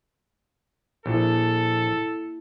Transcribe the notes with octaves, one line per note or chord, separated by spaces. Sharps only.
A#1 A#3 E4 A4